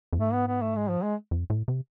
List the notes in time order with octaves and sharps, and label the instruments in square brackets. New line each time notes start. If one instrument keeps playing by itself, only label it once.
[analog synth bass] F2
[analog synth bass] G#2 [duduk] A3
[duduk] B3
B3
A3
G#3
F3
G#3
[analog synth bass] F2
A2
C3